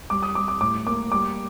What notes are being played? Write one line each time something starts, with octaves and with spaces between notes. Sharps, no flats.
G3 D6
D#6
G3 D6
D6
A2 D6
A#3 D6
G3 D6